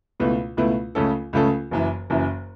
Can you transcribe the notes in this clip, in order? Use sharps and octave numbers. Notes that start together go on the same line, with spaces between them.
C#2 B2 A3 E4 B4
C#2 B2 A3 E4 B4
C#2 C#3 A3 C#4 A4
C#2 C#3 A3 C#4 A4
F#1 F#2 E3
F#1 F#2 E3